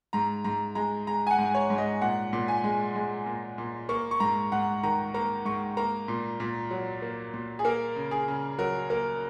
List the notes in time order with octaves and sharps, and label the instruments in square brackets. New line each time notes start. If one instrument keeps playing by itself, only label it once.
[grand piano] G#2 A#5
G#2 A#5
G#3 A#5
G#3 A#5
G#5
F#5
G#2
C#5
G#2
D#5
A#2 F#5
A#2
G#5
G#3
G#3
A#2
A#2
A#3 C#6
C#6
G#2 A#5
G#2 F#5
D#3 A#5
A#3 A#5
G#2 C#6
A#3 A#5
A#2
A#2
F#3
A#3
A#2
G#4
A#3 A#4
C#3
G#4
C#3
F#3 A#4
A#3 A#4